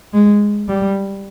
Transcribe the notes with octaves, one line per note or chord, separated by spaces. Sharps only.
G#3
G3